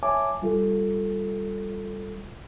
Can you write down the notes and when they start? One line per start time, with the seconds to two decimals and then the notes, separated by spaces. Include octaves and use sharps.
0.03 C#5 E5 G#5 A5 D6
0.42 G3 F4 A4